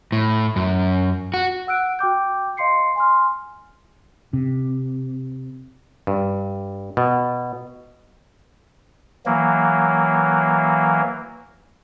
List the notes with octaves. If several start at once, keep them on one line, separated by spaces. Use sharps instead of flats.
A2
F#2
F#4
F#5 E6 F#6 D7
F#4 G5 D6 G6
D#5 F5 C6 C7 C#7
G#5 C6 F6
C3
G2
B2
E3 F#3 A#3